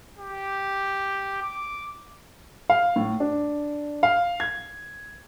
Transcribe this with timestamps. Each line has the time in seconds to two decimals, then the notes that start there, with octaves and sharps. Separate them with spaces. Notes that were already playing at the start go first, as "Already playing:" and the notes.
0.18 G4
1.42 D6
2.70 F5
2.96 A2
3.20 D4
4.03 F5
4.40 G#6